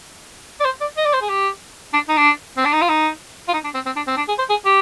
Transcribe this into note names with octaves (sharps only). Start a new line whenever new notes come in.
D5
C5
D5
D#5
D5
C5
G#4
G4
D4
D#4
D4
C4
D4
D#4
F4
D#4
F4
D#4
D4
C4
C4
D4
C4
D4
G#4
C5
G#4
G4